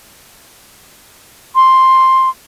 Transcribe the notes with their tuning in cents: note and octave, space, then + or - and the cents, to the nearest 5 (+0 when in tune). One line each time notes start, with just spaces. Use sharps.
C6 +5